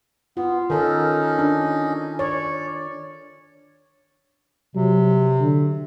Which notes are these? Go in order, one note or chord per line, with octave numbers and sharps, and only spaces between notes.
B3 F4
D#3 C#4 D#4 A4 A#4
D4
C#5 D5
C3 F#3
D3